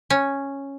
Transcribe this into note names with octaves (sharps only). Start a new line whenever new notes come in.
C#4